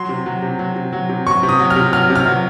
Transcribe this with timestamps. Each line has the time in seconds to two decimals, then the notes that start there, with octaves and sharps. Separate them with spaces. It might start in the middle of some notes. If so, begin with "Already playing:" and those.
Already playing: F#3 C6
0.09 C3
0.26 F#3
0.42 C3
0.59 F#3
0.76 C3
0.93 F#3
1.09 C3
1.26 F#3 C#6
1.43 C3
1.49 D#6
1.60 F#3
1.70 F6
1.76 C3
1.93 F#3 F6
2.10 C3
2.15 F6
2.26 F#3